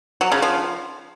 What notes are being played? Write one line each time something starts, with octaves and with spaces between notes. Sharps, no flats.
F#3
C#3
F3